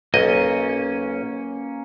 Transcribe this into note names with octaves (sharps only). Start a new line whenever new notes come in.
B1 A#3 C#4 D#5